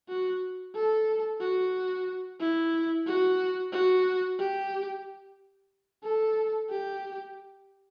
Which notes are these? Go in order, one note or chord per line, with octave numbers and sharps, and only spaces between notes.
F#4
A4
F#4
E4
F#4
F#4
G4
A4
G4